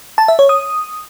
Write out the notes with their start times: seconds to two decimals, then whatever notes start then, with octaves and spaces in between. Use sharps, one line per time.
0.18 A5
0.28 E5
0.39 C#5
0.49 D#6